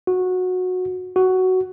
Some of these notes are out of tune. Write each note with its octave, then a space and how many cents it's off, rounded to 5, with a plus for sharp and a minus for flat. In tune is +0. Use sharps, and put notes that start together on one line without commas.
F#4 -15
F#4 +10